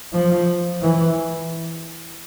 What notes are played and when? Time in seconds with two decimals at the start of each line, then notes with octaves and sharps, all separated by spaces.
0.13 F3
0.82 E3